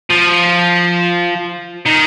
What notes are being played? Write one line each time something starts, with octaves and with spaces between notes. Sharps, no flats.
F3
D#3